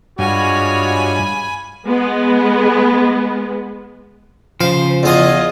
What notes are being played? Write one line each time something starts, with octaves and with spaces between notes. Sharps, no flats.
G2 G#3 F4 F#4 C#5 G#5 B5
G#3 B3
C#3 F3 C5 F5
E2 F4 G#4 D#5 D#6